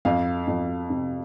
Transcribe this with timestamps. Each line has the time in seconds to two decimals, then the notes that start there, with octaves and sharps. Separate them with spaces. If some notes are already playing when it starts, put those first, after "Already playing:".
0.05 F2 F5
0.47 F2
0.90 C3